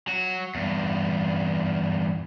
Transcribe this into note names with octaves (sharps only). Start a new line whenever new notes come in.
F#3 F#4
E2 G2